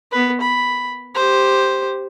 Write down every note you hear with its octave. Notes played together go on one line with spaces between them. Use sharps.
B3 B4
B5
G4 C5